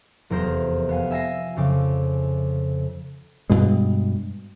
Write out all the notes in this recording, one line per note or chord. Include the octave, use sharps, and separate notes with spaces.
F1 E2 A#4 C5
B3 F5 G#5
E5 G#5 A#6 C7
F2 C#3 G#5 D6
G2 B2 G#3